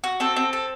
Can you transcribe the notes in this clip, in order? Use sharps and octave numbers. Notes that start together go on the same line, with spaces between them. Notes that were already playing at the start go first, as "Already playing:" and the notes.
F#4
C4 A4
C4
A4